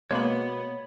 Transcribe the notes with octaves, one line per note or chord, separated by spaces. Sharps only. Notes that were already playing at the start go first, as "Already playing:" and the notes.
B2 G#3 A#3 B3 C#5 B5